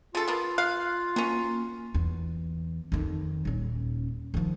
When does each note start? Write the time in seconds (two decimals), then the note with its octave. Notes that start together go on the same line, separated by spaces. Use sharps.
0.15 C#3 F4 A4
0.28 A#3 B3
0.58 F5 F#6
1.16 F#3 A#3 C#4
1.94 E2
2.92 F2 D#3
3.45 D#1 C#4
4.34 D#3 F3